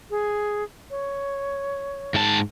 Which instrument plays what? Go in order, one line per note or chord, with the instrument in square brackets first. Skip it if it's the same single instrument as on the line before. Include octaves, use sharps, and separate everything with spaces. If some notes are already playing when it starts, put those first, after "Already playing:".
[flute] G#4
C#5
[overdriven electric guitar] G#2 A5